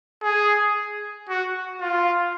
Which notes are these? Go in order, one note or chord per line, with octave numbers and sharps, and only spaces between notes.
G#4
F#4
F4